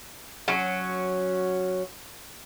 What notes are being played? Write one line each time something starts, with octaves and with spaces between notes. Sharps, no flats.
F#3 C#4